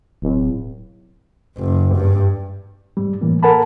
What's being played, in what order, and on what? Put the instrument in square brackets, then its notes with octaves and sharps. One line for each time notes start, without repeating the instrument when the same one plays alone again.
[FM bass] D1
[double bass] F#1
G2
[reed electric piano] G#2 G3
A2 E3 A#3
A4 A#4 F#5 G#5 A5 B5